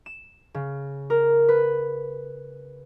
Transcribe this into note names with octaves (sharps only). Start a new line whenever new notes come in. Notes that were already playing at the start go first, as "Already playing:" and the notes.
E7
C#3
A#4
B4